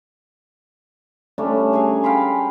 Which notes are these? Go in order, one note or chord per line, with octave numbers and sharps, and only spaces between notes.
G3 A3 C#4 D4
G#4 A#4 C#5 G#5
F5 G5 B5 C6